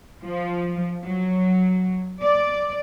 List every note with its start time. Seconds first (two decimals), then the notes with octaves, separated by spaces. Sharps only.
0.23 F3
1.04 F#3
2.21 D5